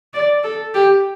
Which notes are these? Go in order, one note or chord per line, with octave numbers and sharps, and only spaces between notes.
D5
A4
G4